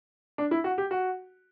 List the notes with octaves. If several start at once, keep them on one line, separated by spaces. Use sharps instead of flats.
D4
E4
F#4
G4
F#4